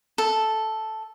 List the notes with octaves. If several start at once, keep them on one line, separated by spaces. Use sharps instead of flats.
A4